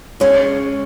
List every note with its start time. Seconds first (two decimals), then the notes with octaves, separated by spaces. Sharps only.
0.20 C#3 G#3 C#4 C#5